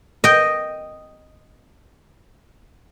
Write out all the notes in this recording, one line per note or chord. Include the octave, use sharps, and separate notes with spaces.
D#5 G5